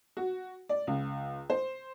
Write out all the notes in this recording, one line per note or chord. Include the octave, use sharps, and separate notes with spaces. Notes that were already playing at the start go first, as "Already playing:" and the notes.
F#4
D5
C#2
C5